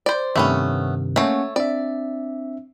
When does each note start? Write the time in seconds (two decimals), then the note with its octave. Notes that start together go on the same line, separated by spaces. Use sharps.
0.06 C5 D5
0.36 G2 C3 D#3 A3 B3 C#4
1.16 A3 A#3 C#4 C#5 F#5
1.56 C4 D4 D5 E5